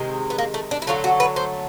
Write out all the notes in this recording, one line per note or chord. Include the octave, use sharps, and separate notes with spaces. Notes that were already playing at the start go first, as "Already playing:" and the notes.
Already playing: C3 D#3 G#3
B3
A#3
A3
D4
E4
D3 F#3 A3 F4
F#4
B4
C5